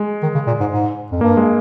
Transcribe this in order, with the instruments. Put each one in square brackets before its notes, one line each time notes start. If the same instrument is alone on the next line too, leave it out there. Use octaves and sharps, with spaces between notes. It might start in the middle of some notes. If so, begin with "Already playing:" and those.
Already playing: [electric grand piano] G#3
[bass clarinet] D#3
C#3
A#2
G#2
G#2
F2
[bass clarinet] G2 [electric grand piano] A#3
[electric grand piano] G#3